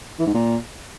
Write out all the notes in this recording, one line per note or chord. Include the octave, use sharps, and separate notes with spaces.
E3
G#2
A#2